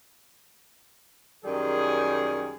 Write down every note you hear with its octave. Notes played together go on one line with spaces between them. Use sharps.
F#2 D#3 G3 G#4